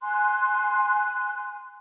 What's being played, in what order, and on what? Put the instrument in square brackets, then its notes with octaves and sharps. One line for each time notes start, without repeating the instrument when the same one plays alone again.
[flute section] G#5 C6 F#6